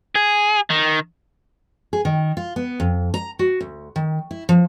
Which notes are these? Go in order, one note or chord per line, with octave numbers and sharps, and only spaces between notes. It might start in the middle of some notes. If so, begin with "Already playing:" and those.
G#4
D#3
G#4
D#3
F4
B3
F2
A#5
F#4
D2
D#3
E4
F3